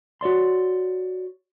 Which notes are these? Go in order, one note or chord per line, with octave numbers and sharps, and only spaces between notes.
F#4 C#5 D5 C6